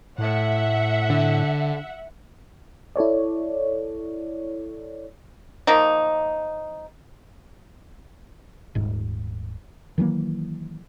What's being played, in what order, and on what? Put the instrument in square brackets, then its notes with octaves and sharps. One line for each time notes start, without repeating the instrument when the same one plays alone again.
[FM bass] A2 [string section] E5 F#5
[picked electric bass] D3
[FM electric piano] E4 A4 C#5 D5
[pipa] F3 A#3 D#4
[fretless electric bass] D#1 G#2
D#3 E3 F#3 A#3